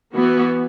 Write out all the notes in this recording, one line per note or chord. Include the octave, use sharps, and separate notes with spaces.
E3 B3 F#4